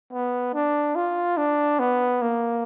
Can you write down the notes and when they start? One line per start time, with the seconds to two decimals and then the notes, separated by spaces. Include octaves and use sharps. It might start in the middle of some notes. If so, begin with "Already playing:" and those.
0.12 B3
0.54 D4
0.95 F4
1.37 D4
1.79 B3
2.22 A#3